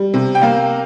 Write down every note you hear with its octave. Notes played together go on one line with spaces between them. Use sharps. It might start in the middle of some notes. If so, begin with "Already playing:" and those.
Already playing: G3
C3
G5
A#3 F5